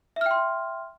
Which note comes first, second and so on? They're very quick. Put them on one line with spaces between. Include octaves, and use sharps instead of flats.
E5 F6 G5 C6